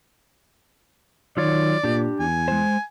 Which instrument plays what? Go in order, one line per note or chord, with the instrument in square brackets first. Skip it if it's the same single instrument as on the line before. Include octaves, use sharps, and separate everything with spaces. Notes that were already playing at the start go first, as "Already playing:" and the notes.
[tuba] D#3 [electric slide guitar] F#3 F4 C#5 [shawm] D5
[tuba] A#2 [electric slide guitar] D4 G4
[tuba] E2 [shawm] G#5
[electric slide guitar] G#3 C5